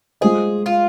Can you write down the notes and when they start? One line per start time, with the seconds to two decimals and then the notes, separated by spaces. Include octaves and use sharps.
0.21 G#3 F4 G#4 C5 D#5
0.66 F4